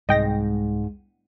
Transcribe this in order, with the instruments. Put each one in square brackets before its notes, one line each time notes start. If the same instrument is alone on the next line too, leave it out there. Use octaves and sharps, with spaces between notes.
[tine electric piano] C2 G#3 [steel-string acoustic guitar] G#2 [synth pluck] D#5 G5 A#6